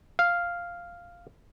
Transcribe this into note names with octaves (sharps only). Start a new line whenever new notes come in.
F5